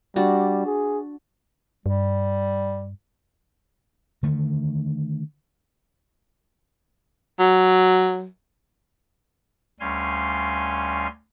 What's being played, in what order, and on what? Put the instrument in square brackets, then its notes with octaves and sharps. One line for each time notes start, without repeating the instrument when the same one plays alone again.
[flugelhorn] G3 [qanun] D4 F#4
[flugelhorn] G#4
[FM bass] G2 [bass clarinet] G3
[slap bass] D3 D#3 A3
[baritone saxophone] F#3
[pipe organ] D2 G3 C#4 F5 G#5 C6